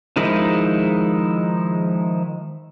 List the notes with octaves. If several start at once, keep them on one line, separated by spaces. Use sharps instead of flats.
D#3 F3 G#3 D#4 E4